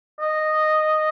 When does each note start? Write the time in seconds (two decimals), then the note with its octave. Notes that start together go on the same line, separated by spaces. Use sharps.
0.20 D#5